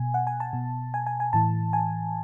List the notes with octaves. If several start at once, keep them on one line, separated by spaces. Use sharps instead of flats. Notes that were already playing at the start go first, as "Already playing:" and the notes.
Already playing: B2 G#5
F#5
G#5
A5
B2
G#5
G#5
G#5
A2 E3 A5
G#5